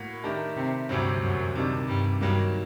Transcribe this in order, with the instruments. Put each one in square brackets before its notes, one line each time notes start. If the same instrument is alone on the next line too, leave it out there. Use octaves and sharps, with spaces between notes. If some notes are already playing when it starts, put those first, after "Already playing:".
Already playing: [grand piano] A2 A#3 F#4
D#3 A3 D4 G4 A#4
[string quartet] C3 C4
[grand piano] D2 C3 F#3 C4 [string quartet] G2 G3
[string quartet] F#2 F#3
[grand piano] C3 D#3 G3 D4
[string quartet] G2 G3
[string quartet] G2 G3 [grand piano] D#3 F#3 A#3